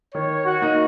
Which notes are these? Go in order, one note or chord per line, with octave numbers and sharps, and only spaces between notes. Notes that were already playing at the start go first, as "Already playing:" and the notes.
D#3 C#5
F#4
A#3 D#4